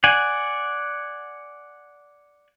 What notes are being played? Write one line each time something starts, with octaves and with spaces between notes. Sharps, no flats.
D5 F#5 G#5